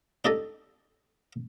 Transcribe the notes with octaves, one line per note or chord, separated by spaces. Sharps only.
D4 D#4 G4 A4 D5 D#5